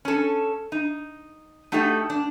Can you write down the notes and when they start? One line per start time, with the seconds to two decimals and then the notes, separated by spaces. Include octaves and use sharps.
0.05 C#4 A4
0.72 D#4
1.72 A3 D#4 F#4 G4 A4
2.10 D4